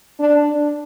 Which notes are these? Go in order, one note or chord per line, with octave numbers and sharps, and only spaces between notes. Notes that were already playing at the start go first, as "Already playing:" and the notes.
D4